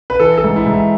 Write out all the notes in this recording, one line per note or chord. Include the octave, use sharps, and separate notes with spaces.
B4
E3 A4
A4
G#2
E4
G#2
E4